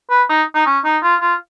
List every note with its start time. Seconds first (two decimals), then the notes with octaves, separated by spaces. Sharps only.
0.10 B4
0.29 D#4
0.55 D#4
0.66 C#4
0.85 D#4
1.03 F4
1.21 F4